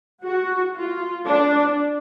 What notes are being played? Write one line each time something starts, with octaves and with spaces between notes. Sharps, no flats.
F#4
F4
D4